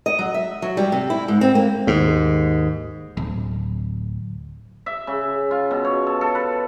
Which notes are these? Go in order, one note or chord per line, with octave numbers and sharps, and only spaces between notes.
D#5
F#3
E5
F#3
G3
C3
E4
G#2
C4
A#3
D#2 G#2
D1
E5
C#3
F4
B2
C#5
A4
A4
B4